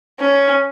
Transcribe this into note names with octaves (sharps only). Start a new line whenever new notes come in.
C#4